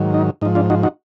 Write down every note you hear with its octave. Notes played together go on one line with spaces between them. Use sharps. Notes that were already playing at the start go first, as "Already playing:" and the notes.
Already playing: G#2 D#3 F#3
D#4
G#2 F3 D#4
D4 F4
D#4 F#4
D#4 F#4